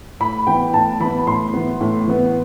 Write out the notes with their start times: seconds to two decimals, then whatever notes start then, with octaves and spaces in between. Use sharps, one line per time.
0.20 A2 B5
0.47 E3 B3 G5
0.74 A2 A5
1.00 E3 B3 B5
1.27 A2 C6
1.53 E3 B3
1.80 A2
2.07 E3 B3